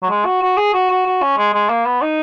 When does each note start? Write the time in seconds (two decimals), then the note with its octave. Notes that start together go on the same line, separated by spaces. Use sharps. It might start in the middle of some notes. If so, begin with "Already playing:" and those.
0.02 F#3
0.09 G#3
0.25 F#4
0.42 F#4
0.57 G#4
0.74 F#4
0.90 F#4
1.06 F#4
1.22 C#4
1.37 G#3
1.53 G#3
1.69 A#3
1.85 B3
2.01 D#4